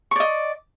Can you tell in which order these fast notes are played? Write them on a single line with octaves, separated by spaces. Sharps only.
C#6 D5 D#5